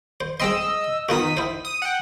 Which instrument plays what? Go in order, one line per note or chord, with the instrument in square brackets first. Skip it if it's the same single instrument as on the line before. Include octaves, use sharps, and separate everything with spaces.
[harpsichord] C5
[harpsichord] G#3 C4 C6 [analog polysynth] D#5 E6
[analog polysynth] D#3 D#6 B6 [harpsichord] B3 F4 F#4
[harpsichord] E4 C5
[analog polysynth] D#6
F#5 G5